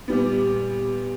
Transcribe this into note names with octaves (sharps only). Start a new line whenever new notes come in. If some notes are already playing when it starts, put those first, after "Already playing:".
A#2 G3 B3